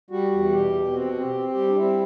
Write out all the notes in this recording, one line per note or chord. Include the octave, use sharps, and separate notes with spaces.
G3 F#4
E2
B2 G4
B2
C4 F#4
C4
G4
C4
G4
G3
D4
C4 E4